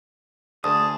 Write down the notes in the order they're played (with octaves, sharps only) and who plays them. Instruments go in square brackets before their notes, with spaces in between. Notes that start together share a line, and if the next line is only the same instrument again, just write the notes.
[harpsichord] D2 [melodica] G#4 A5 [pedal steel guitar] D#6